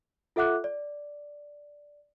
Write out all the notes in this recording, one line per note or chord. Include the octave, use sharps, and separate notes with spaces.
F4 A4 E5 F#5 D6 F#6
D5